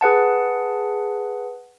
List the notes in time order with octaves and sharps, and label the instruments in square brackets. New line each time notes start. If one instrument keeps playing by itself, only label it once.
[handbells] G#4 B4 F#5 A5